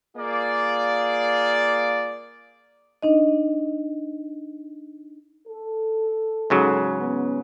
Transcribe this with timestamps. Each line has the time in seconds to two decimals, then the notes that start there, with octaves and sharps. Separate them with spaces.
0.17 A#3 F4 G#4 D5
3.03 D4 D#4 D#5
5.47 A4
6.50 G#2 C#3 F#3
6.98 B3 C#4